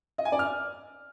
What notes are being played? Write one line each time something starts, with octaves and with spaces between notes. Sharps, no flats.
D#5
G#5
D5
F6